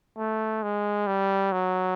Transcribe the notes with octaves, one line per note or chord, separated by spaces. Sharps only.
A3
G#3
G3
F#3